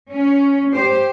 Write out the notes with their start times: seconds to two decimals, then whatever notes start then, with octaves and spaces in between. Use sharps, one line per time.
0.11 C#4
0.73 G4 C5